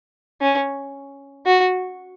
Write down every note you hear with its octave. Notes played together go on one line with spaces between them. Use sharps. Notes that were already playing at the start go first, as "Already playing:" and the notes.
C#4
F#4